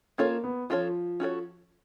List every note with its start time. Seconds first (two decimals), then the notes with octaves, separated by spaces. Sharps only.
0.18 A#3 C#4 F4 A4 C#5
0.44 B3
0.70 F3 C#4 F4 A4 C#5
1.20 C#4 F#4 A4 C#5